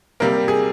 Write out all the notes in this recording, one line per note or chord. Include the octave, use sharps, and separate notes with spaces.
C3 G3 A#3 A#4
G#4